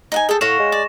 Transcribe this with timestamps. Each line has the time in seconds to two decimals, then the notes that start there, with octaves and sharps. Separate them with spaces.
0.12 D#4 F#5 G#5
0.29 G#4 A4 G5
0.41 A2 C#5 F5 F#5 C#6 A#6 E7
0.59 G#3
0.72 D5